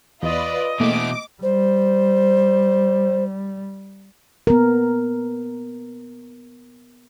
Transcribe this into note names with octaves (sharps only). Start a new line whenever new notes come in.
E2 F4 B4 D5 D#5
B2 E3 A3 A#3 E4 D6
G3 C5
B3 A#4